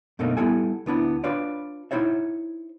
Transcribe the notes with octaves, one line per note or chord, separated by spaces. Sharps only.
F#2 B2 D3 A3 A#3 D#4
G3 B3 E4 A4 G#5
D2 B3 D4 E4
D4 F4 B4 C#5 D5
D#4 E4 C5 C#5 E5